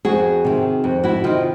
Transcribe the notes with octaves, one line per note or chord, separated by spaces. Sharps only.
F2 F#4 G#4
C3 D#3
F2
E4 F#4
C3 D#3 D#4 F4